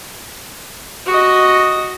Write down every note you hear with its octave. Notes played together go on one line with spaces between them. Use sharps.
F#4 D#5